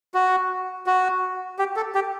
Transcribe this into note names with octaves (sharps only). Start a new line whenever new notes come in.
F#4
F#4
G4
A4
G4